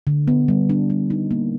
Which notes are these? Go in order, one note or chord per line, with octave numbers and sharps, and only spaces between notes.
D3
B3
G3
D4
G3
D#4
A#3